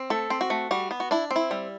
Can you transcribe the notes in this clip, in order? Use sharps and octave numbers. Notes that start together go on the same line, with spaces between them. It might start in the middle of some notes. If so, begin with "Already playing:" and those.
Already playing: C4
A3 A4
C4
F#4
A3
G3 F#4
B3
F#4
D4 E4
C4
E4
G3